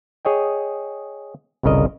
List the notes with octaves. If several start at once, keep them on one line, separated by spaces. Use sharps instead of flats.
G#4 C#5 D#5 G5
G1 C2 C#3 A#4 D#5